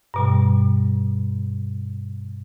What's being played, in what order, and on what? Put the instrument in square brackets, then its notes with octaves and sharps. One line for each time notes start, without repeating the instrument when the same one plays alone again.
[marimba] G2 B2 G3